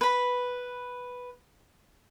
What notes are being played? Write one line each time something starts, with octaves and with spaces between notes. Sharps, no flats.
B4 B5